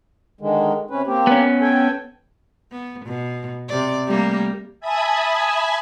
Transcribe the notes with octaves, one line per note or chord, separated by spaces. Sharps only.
D3 D#3 G#3
C3 C#4 B4
A#3 C4 G4
B3 C#4
A4 G5 G#5
B3
B2
C3 D5
G3 A3 A#3
E5 G#5 A5 B5 D#6 G#6